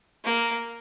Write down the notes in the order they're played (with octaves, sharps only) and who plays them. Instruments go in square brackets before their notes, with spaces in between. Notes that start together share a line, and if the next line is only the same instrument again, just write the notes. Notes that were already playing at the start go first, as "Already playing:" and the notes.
[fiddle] A#3